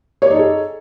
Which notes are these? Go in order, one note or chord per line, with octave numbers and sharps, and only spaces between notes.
D#4 G#4 A4 C#5 D5